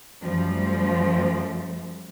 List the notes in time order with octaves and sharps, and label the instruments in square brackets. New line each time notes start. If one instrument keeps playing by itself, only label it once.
[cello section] F#2 F3 G3 A3